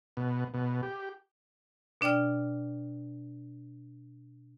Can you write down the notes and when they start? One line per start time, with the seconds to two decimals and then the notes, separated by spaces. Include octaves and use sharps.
0.17 B2
0.54 B2
0.83 G4
2.01 B2 D4 D5 G5 F6